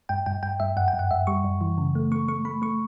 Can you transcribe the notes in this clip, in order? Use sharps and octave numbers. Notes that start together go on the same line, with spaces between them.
G2 G5
G2 G5
G2 G5
G2 E5
F#2 F#5
G5
F#2
F#5
F#2 E5
G3 C#6
F#2
E3
C#3
A3
A3 C#6
A3 C#6
A3 B5
A3 C#6